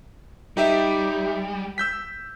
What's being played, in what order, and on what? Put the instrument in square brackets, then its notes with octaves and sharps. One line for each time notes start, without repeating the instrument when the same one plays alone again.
[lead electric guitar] G3 [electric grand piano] D#4 G4 E5
[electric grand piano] E6 G6 B6